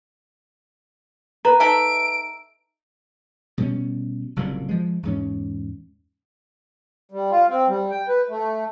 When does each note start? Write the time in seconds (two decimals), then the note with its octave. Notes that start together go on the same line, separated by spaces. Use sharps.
1.45 B4 A#5
1.60 D#4 A4 E5 D7
3.58 B2 G3 C#4
4.36 F#1 C2 F#2 A#2
4.68 F3 G#3
5.03 E2 G#2 C#4
7.12 G3
7.31 F4
7.49 C4
7.68 G3
7.91 G5
8.08 B4
8.29 A3